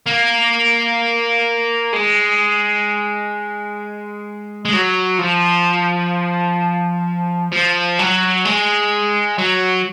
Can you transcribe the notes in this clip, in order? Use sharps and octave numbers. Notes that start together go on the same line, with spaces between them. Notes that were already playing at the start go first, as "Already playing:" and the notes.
A#3
G#3
G#3
F#3
F3
F3
F#3
G#3
F#3